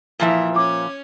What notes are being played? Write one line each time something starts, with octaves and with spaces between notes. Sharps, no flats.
A#2 E3 F3 E5
C#4 D6